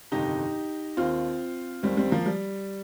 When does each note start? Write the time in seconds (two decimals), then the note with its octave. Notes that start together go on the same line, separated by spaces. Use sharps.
0.12 G1 F2 C3 D#3 D#4 G4
0.97 D#2 D#3 C4 F4
1.83 D#2 D#3 G3 C4
1.97 G3 C4
2.11 F3 A#3
2.26 G3